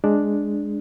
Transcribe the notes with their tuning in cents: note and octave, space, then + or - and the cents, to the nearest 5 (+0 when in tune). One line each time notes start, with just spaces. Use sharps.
G#3 +0 D4 +0